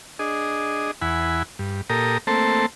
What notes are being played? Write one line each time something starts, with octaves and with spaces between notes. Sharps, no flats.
D4 G#4 D#5
E2 E4 F#5 G#5 B5
G2
A#2 G4 A4 A#4 A#5 D#6
A3 A#3 C4 A4 C5 A5